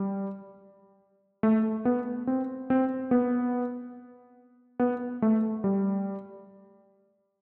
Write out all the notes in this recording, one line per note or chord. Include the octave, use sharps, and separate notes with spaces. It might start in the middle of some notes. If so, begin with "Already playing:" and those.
Already playing: G3
A3
B3
C4
C4
B3
B3
A3
G3